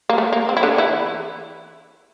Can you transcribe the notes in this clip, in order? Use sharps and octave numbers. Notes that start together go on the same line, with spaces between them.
A#3
A3
A#3
C4
E4
D3 D4
E3 E4